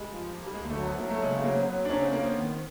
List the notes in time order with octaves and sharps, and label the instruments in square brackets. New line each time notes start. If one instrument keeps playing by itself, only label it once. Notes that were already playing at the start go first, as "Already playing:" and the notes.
Already playing: [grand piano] G3 G#3
[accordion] F3
A#3
[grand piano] G3
[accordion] D2 [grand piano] G#3
[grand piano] A3
[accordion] F#3
[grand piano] B3
[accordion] F#3 [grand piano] A#3
[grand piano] A3
[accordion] C#3 [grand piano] G#3
[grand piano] A3
[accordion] F#3 [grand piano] A#3
[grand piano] C4
[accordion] F#3 [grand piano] B3
[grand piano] D4
[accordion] C#3 [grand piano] C#4
[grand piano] C4
[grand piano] A#3 [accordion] B3
[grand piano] C4
[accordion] D#3